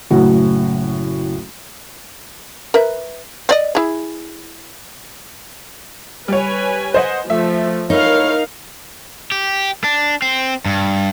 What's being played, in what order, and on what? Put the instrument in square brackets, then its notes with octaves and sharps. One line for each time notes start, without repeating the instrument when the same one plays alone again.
[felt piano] F#1 A2 F#4
[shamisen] A#4 B4 E5
C4 D5 D#5
E4 G#4
[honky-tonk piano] G3 C#5 [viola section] B4 G#5
[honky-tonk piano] C5 D#5 F#5
[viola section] F3 [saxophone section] A3 [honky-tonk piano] E5
[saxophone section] A3 E4 C#5 [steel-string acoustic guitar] D#4 [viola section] A#4 F5
[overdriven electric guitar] G4
D4
C4
G2